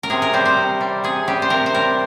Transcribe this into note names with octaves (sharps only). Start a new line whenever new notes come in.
A#4
C3 G#4
A#4
G3 C5
C5
C3
G3
C3 G#4
G3 G4
C5
C3 A#4
C5
G3 A#4